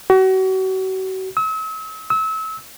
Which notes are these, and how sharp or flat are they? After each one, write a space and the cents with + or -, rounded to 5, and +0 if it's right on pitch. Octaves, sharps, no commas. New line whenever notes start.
F#4 +35
E6 -40
E6 -30